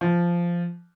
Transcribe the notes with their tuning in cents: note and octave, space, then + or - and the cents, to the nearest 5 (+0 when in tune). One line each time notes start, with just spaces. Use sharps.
F3 -10